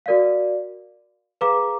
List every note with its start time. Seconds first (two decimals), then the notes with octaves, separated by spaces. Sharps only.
0.06 F#4 A#4 D5 F5
1.41 G#4 B4 F5 A#5 D6